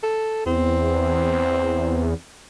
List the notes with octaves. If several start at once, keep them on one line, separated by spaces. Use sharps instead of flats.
A4
E2 C4